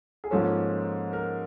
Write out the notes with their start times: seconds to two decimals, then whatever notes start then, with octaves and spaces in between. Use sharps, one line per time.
0.24 G#4
0.31 G#2 F3 A#3 C#4 A4
1.13 A#4